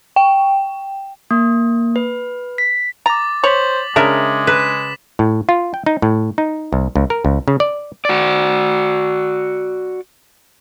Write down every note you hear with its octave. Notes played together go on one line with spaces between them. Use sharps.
G5
A#3
B4
B6
A#5 D6 A6
C5 C#5 B6 F#7
C#3 G#3 D4 A#4 E5
B4 B6 E7
A2
F4
G5
D#4
A2
D#4
C2
C#2
A#4
C#2
C#3
D5
F#4 D5